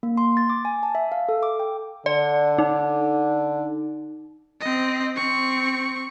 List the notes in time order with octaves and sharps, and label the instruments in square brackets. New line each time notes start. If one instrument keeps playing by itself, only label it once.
[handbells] A#3
C6
A6
D6
G#5
A5
E5
F5
A4
D6
G5
[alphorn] D3 [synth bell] D5
[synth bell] D#4
[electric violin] C4 D#5
C4 C#6